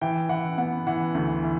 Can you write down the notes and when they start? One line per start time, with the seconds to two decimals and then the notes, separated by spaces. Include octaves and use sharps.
0.01 E3 G5
0.29 E3 F#5
0.58 B3 F#5
0.87 E3 F#5
1.15 D2
1.43 E3